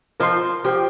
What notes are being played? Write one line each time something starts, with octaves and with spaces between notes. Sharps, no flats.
F3 A#4 D#5 C6
F3 G4 C5 G5